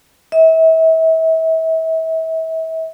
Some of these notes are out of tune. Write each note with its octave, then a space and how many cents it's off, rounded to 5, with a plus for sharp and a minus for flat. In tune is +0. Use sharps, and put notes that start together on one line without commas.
E5 -35